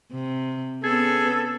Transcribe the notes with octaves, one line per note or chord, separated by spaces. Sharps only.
C3
B3 C#4 G#4 A4